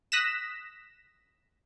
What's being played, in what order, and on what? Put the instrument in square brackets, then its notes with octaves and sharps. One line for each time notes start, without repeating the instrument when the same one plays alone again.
[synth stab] D#6 F#6 A#6 B6 E7